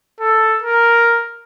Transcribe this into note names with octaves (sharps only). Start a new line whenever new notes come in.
A4
A#4